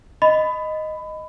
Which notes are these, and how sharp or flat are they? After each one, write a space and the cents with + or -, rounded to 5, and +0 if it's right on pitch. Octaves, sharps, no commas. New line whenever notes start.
D#5 +0 B5 +20